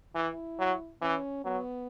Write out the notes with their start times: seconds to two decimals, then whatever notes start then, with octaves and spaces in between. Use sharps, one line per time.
0.15 E3 E4
0.59 F#3
1.02 E3 C#4
1.44 F#3 B3